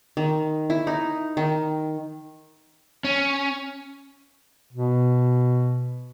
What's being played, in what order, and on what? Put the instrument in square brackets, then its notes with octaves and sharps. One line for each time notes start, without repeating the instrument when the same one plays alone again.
[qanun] D#3
E4
D#4
D#3
[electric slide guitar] C#4
[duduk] B2